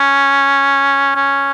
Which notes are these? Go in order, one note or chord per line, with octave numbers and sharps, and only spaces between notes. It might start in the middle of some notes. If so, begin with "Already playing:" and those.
Already playing: C#4
C#4